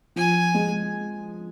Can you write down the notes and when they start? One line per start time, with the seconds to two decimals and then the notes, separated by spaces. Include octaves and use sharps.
0.16 F3 G#5
0.54 G#3